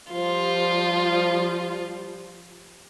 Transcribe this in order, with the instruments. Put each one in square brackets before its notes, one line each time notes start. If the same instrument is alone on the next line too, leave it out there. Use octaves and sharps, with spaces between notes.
[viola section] F3 G3 [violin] F4 [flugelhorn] C5